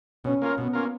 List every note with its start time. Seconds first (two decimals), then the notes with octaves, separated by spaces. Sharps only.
0.24 B2 C#4
0.42 A#3 C#4 F4 A#4
0.58 B2 B3
0.73 A#3 C#4 F4 A#4